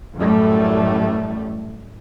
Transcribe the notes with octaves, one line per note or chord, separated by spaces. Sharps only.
A1 F#2 A2 G3 A3